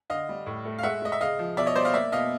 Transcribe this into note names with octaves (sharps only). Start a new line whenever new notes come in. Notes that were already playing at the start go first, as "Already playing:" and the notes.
D3 D#5 F5
G3
A2
A3
F5
G#3 E5 F#5
G#3 D#5
E5
C#3 D#5 F5
F3
B2 D5 E5
C#5 D#5
G3 C5 D5
D#5 F5
A#3 D5 E5
B2 D#5 F5